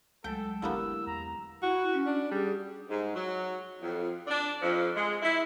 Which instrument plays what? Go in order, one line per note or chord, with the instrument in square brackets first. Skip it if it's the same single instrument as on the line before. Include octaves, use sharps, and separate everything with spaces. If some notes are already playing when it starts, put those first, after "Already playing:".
[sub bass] C#2 [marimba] F#3 G#3 A3 [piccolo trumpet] A4 [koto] G5
[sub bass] G1 [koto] D3 A#3 B3 [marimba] E4 G4 A#4 [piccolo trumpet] E6
[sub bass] E2 [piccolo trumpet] A#5
[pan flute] E4 [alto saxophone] F#4
[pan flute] C#4
[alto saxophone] D4
[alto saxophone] G3 [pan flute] G#4
[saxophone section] G#2
F#3
F2
D4
F2
G#3
E4